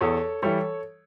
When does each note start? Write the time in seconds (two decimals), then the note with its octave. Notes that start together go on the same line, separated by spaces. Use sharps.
0.01 E2 A4 C#5
0.42 E3 G3 A4 C#5